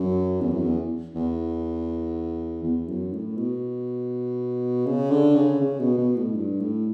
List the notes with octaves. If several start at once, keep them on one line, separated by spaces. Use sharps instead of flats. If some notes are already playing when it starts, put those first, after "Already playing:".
Already playing: F#2
E2
F#2
E2
E2
E2
F#2
A2
B2
C#3
D3
C#3
C#3
B2
B2
A2
G2
A2